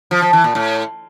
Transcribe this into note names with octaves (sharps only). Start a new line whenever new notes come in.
F3
F3
E3
A#2
A2